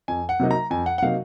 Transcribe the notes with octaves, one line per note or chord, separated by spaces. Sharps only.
F2 G#5
F#5
C3 F#3 A#3 D#4
A#5
F2 G#5
F#5
F#5
C3 F#3 A#3 D#4 F5